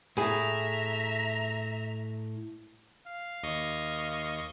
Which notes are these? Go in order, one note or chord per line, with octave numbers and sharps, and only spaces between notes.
A2 G#4 E5 A#5
F5
D#2 D#5 C#6